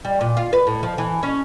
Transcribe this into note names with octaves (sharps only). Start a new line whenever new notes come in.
G3
A#2
F4
B4
A2
F3
E3
C#4